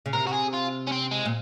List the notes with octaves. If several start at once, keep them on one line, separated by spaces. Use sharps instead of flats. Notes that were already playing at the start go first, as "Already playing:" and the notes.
C#3
C3 A#4
F#4
G#4
F4
C#4
C4
G#3
A#2